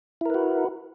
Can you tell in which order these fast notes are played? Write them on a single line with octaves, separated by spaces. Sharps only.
E4 A#4 B4 F#4